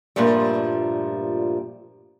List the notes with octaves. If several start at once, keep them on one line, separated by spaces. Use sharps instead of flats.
G2 A#2 F3 G3 A3